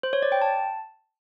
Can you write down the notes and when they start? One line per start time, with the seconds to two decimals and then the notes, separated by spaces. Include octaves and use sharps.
0.03 C5
0.13 C#5
0.22 D5
0.32 G5
0.42 A5